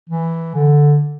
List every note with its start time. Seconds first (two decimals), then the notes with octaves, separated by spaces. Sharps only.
0.09 E3
0.54 D3